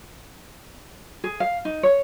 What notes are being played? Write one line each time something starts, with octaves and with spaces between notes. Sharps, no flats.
G#4
F5
D#4
C#5